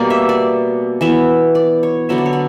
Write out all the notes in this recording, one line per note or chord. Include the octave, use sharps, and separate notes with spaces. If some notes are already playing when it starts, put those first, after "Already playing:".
Already playing: B2 G3 A#3 D5
E5
D5
E3 B3 E5
D5
C#5
D3 F#3 B3 E5
D5
C#5
D5